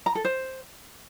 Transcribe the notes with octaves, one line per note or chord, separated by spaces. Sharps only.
A#5
A4
C5